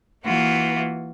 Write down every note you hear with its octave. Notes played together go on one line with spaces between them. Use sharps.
E3 A#3 F4 F#4